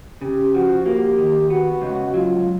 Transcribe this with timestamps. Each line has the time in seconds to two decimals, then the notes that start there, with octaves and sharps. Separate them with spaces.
0.21 C#3 G4
0.54 F3 F#4
0.86 A#3 G4
1.18 D#3
1.49 B3 F#4
1.82 C#2
2.14 F#3 F4